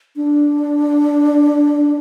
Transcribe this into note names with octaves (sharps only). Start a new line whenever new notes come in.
D4